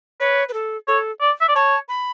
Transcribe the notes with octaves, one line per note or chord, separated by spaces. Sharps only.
B4 C#5
B4
A4
A4 C#5
D5
E5
D5
C#5 A5
B5